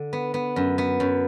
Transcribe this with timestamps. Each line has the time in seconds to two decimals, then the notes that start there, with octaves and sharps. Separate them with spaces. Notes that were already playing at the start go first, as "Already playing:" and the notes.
Already playing: D3
0.13 B3
0.34 B3
0.56 F#2
0.78 B3
1.00 F#2